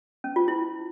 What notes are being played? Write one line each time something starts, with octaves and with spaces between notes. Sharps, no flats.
C#4
F4
E4